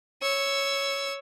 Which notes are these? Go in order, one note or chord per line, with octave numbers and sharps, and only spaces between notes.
C#5 E6